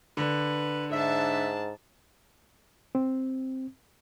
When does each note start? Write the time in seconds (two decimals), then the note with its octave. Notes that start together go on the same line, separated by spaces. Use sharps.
0.17 D3 B4
0.92 G#2 D4 E5 A5
2.95 C4